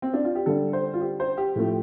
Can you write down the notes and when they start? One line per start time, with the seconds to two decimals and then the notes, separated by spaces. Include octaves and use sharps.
0.02 C4
0.14 D4
0.24 F4
0.35 G4
0.46 D3 G3 A4
0.73 C5
0.94 F4
1.01 G4
1.20 C5
1.37 G4
1.56 A2 F3 A3